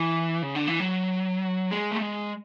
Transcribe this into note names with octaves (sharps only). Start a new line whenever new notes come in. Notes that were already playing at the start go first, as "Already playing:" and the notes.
Already playing: E3
C#3
D3
E3
F#3
G#3
A3
G#3